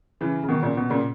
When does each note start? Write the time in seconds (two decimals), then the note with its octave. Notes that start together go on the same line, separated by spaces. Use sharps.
0.21 C#3 E3
0.43 C#3
0.48 B2 D#3
0.63 A#2 C#3
0.77 B2
0.90 A#2 C#3